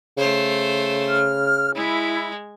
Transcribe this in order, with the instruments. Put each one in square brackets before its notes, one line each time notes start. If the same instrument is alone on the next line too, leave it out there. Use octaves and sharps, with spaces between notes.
[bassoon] C#3 [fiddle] A3 C5
[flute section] F6
[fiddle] G#3 [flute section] E4